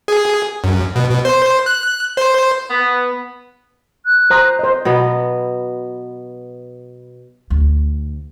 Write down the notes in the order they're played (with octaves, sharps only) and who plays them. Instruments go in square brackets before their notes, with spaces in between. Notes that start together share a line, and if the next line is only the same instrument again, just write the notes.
[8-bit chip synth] G#4
F#2
B2
B2
C5
F#6
C5
[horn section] B3
[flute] F#6
[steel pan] C5 A#5 D#6
C5 D#5
[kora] B2 F#3 B3
[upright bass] D2